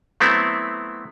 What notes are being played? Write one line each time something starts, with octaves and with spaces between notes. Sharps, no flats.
F#3 A3 B3 C4 E4